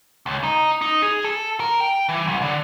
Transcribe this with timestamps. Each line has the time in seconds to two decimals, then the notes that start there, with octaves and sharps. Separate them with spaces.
0.26 C#2
0.43 D#4
0.81 D#4
1.02 G#4
1.24 A4
1.60 A#4
1.80 G5
2.09 E3
2.27 C2
2.42 D3